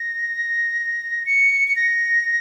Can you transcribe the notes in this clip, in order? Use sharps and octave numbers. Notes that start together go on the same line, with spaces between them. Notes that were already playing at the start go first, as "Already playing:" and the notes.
Already playing: A#6
C#7
C#7
A#6